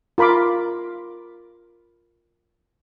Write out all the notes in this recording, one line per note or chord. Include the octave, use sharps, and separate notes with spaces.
F4 A#4 B5 C6 D6